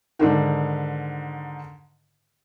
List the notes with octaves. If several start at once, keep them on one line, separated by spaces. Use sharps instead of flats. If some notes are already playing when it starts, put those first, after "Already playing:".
G#2 D3 D#3